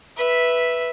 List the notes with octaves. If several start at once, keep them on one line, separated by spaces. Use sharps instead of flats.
B4 E5